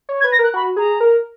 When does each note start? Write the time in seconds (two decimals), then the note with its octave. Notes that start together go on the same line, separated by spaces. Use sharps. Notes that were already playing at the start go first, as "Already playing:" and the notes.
0.09 C#5
0.20 G#6
0.24 B4
0.32 A#6
0.39 A#4 F#6
0.54 F#4 B5
0.76 G#4 A#5
1.00 A#4